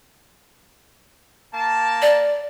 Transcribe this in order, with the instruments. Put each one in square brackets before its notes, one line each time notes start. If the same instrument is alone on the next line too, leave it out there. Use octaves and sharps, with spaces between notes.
[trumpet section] A#3 A5
[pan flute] D5